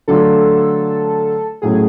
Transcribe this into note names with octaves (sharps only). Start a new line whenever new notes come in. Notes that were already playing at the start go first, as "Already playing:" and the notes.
D3 F#3 A3 D4 F4 A4
A2 F#3 A3 C#4 G#4